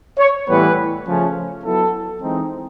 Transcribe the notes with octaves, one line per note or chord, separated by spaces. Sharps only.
C#5
A2 E3 G3 B3 E4 B4
C#3 F3 A3 C#4
F#3 B3 E4 A4
E3 G#3 C4 D#4